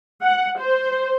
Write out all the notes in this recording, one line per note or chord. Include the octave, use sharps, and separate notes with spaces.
F#5
C5